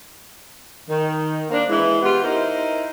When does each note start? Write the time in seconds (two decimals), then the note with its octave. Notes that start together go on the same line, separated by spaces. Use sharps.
0.89 D#3
1.50 A#3 C4 D4 A#4
1.70 E3 G#3
2.02 B3 F4 G4
2.23 D#4 E4 A#4 C5